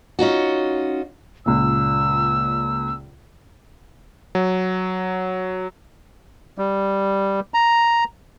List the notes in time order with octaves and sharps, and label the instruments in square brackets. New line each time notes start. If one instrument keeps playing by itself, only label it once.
[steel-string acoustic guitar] C#4 D#4 F4 F#4
[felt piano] C#2 A#2 [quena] E6
[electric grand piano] F#3
[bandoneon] G3
A#5